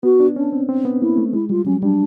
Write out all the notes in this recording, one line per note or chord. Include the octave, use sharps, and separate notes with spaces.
B3 F#4
D4
C#4 D4
C4
C4
B3
A#3 E4
A3
G#3 E4
G3 F4
F#3 C#4
G3 D4